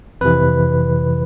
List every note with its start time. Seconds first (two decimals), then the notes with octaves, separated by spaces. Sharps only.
0.21 F2 C3 E3 B4